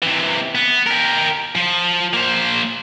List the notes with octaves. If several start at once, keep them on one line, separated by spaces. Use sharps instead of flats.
C3 E3
B3
G4 A#4
F3
A#3 C5